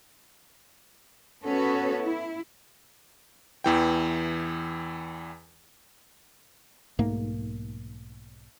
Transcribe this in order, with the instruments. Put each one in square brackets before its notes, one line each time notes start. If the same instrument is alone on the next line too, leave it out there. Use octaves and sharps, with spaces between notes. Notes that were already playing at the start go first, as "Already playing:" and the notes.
[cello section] B3 C#4 F#4 A4 B4 C#5
E4
[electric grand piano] E2 E3 G5
[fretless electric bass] B1 G#2 A3 A#3